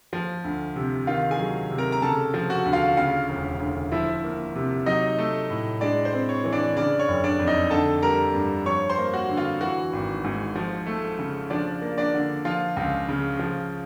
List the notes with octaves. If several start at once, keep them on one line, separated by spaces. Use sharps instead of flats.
F3
D2
C3
D#3 F4 F5
G#4 G#5
F#3
C3
A#4 A#5
A#5
C#3 A4 A5
F3
F#4 F#5
D2
F4 F5
C#3 F4 F5
E1
D2
F3 E4 E5
A#3
C3
F#3 D#4 D#5
A3
A2
G#3 D4 D5
C5
C4
C#5
E3
D4 D5
C#3 D4 D5
C#5
F#1
D4 D5
F2
D#4 D#5
D3 A4 A5
G3 A#4 A#5
G2
F3 C#5 C#6
C5 C6
A#3
F#4 F#5
D3
F4 F5
E3 F#4 F#5
G#1
G#2
F3
A3
C#3
F3 D4 D5
A#3
D4 D5
D3
F3 F4 F5
C#2
C#3
F3